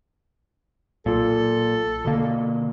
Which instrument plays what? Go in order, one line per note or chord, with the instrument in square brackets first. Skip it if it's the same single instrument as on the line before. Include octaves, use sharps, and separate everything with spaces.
[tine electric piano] B1 F4 [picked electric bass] A#2 [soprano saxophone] A4
[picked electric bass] B2 A#3 [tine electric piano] D3